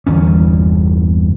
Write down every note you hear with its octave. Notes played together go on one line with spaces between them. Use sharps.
G1 E2 C#4